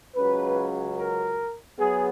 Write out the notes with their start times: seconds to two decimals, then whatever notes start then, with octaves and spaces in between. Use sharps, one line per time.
0.15 C#2 C#3 F#3 B4
0.98 A#4
1.79 F#3 B3 G#4